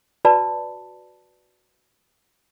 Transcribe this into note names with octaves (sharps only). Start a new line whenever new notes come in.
F#4 B4 D5 A5 B5